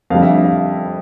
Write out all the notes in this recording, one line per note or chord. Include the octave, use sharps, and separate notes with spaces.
F2 D3 G3 F5
E5
E5
F5